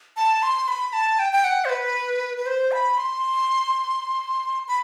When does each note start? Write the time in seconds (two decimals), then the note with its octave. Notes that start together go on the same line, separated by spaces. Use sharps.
0.17 A5
0.42 C6
0.68 B5
0.93 A5
1.19 G5
1.32 G5
1.44 F#5
1.65 C5
1.70 B4
2.37 B4
2.46 C5
2.72 B5
2.98 C6
4.68 B5